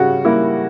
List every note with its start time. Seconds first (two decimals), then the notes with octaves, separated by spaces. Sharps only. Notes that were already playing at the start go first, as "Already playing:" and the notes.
Already playing: C#3 G3 F#4
0.25 G3 A#3 E4